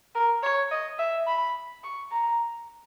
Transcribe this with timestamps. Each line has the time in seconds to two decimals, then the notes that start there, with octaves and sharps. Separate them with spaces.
0.15 A#4
0.43 C#5
0.71 D#5
0.99 E5
1.27 B5
1.84 C#6
2.12 A#5